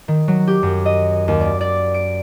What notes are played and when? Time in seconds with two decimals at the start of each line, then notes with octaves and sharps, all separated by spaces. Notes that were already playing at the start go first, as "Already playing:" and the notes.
0.08 D#3
0.28 F#3
0.47 G4
0.63 F#2
0.86 D#5
1.28 D#2
1.41 D5
1.61 D5
1.94 D7